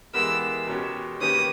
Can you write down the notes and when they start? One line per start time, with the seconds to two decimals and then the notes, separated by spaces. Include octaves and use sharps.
0.14 E3 G#3 B3 G4 A#4 E6
0.67 B2 G#3 C#4 G4
1.21 D#3 A#3 C#4 G4 B4 D#6